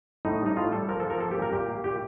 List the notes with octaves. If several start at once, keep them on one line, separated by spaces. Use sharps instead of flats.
A2 D#4
G3
D#4
A2 F4
G3 A4
F3 A#4
A4
F3
A#4
A#3 A4
G4
A#2
A#4
A#2 G4
A#3
A#2 G4